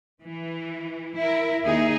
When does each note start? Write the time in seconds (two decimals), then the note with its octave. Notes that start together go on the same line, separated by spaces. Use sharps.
0.22 E3
1.17 E4 A#4 E5
1.63 D#2 D#4 G#4